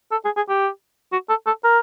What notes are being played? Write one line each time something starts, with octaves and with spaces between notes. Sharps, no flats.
A4
G#4
G#4
G4
F#4
A4
A4
A#4